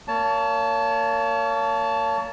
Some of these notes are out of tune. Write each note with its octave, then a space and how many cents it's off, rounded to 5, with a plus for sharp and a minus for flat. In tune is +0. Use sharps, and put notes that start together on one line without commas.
A#3 -25 C#5 +35 A5 +0